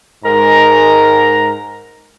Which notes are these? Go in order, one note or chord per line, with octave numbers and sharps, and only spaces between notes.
G#2 G#3 A#4 A#5